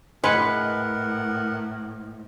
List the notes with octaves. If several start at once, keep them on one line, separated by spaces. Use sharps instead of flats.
A2 G#3 A#4 B4 F#5 C#7